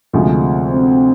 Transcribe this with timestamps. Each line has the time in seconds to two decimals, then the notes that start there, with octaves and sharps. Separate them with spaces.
0.13 D2 C3 F3 G#3
0.69 C4